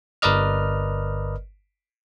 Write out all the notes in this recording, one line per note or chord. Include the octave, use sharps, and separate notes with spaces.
G1 A#4 B4 D5 D#5 F6